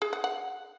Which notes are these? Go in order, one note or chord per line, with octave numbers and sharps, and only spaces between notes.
G#4
F#5
F#5